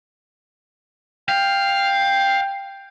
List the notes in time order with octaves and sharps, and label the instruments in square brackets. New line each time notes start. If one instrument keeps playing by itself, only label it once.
[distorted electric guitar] F5 [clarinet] G5